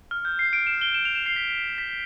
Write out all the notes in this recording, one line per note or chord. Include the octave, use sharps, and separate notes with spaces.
F6
G6
C7
D7
E7
G7
E7
F7
E7
C7
B6
B6